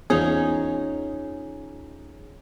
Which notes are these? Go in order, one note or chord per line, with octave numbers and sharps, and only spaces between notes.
E2 C#4 D#4 F4 G#4